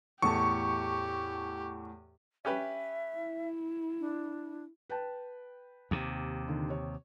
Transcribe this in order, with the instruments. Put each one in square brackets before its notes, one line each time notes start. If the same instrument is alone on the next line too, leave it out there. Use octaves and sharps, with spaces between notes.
[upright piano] E2 A2 A5 [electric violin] G4 [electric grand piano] C#6
[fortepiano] C#4 G4 B4 [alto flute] E5
[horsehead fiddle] E4
[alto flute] D4
[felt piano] B4 G5 A5
[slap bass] D#2 C3
[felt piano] D3 D#3
C#5